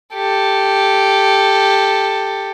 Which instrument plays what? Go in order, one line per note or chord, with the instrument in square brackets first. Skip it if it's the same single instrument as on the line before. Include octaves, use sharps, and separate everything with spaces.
[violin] G4 A4